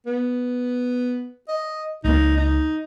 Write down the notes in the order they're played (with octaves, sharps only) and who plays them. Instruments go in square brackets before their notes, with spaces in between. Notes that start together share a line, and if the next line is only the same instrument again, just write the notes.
[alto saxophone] B3
D#5
[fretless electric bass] C#2 A#3 [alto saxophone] D#4
[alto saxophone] D#4